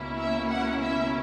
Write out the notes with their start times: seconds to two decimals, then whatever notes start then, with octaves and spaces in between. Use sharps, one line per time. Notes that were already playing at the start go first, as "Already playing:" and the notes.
Already playing: C#2 B2 A#3 C#4 E4
0.19 E5
0.50 F#5
0.83 E5